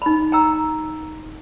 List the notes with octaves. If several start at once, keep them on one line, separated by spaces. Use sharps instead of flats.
D#4 B5
G5 A#5 E6